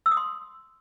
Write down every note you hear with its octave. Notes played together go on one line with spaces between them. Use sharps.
E6
D#6
C6